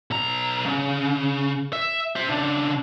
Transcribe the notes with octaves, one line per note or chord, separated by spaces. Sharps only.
B1 A#5
C#3
E5
C5 E5
C#3 D4